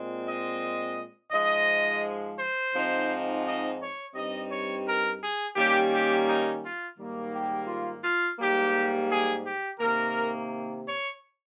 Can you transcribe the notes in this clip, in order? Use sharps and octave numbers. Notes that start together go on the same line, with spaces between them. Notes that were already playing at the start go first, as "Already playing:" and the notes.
Already playing: A#2 G#3 C4
D#5
G#2 F3 G#3 D#5
C5
G#2 F3 C4 D#4
D#5
C#5
G2 G3 C4 D#4 D#5
C#5
A#4
G#4
D#3 G3 A#3 C#4 G4
G4
D#4
F4
G#2 D#3 G3 A#3
G4
F4
F4
G#2 G3 A#3 G4
G#4
G4
C3 D#3 A#3 A#4
C#5